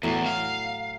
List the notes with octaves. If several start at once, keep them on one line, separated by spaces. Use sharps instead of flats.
E2 A2 F#3
F5